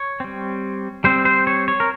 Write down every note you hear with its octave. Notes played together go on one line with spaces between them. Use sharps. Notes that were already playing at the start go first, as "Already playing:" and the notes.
Already playing: C#5
G3 C4
G3 C4 C5
C5
C#5
C#5
A#4